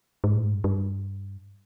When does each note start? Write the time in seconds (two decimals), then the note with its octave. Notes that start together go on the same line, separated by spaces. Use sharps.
0.24 G#2
0.34 A2
0.44 G#2
0.54 G2
0.64 G2